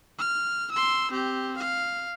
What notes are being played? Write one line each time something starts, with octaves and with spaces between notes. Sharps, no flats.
F6
C6 E6
C4 G4
F5